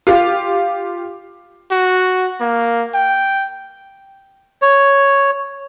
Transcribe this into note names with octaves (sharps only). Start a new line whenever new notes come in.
F4 G4
F#4
A#3
G5
C#5